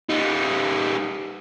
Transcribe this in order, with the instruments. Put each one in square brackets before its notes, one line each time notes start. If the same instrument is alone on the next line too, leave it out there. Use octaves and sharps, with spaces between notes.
[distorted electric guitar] G3 D#4